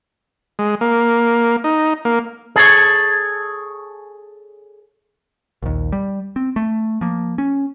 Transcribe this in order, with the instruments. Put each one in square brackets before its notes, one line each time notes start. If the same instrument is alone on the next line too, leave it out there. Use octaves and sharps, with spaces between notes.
[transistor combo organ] G#3
A#3
D#4
A#3
[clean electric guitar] G#4 A4 C#5
[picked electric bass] A#1 D#2
G3
C4
A3
F3 A#3
C#4